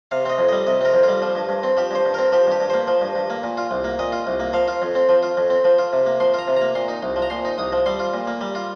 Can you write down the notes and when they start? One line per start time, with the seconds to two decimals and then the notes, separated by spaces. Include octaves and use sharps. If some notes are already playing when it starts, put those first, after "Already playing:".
0.11 C3 F5
0.25 C4 D#5
0.38 F2
0.49 G3 D#5
0.67 C3 D#5
0.81 C4 A#4
0.94 F2
1.03 G3 F4
1.22 F3
1.35 G2
1.49 G2
1.63 C4
1.77 F3 G4
1.91 G2 C5
2.05 G2
2.14 C4 A#4
2.32 F3 G4
2.47 G2 G4
2.60 G2
2.70 A#3 C5
2.87 F3
3.01 G2
3.15 G2
3.30 A#3
3.43 A#2
3.57 F4
3.71 C2
3.84 A#3
3.99 A#2 D#5
4.12 F4
4.27 C2
4.40 A#3
4.53 F3 F5
4.68 F4
4.82 F2
4.95 C4
5.09 F3
5.23 F4
5.37 F2
5.50 C4
5.65 F3
5.78 F4
5.93 C3
6.06 A#3
6.20 F3 C6
6.34 F4 A#5
6.48 C3
6.57 A#3 A#5
6.75 A#2 C6
6.88 D#4
7.03 C2
7.16 F3
7.22 A#5
7.30 A#2 C6
7.45 D#4
7.58 C2 D#6
7.72 F3
7.86 G3 C6
7.99 F4
8.14 A#2
8.27 A#3
8.41 G3
8.55 F4